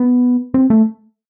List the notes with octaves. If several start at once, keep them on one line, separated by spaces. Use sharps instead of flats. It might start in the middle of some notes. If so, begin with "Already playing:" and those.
Already playing: B3
C4
A3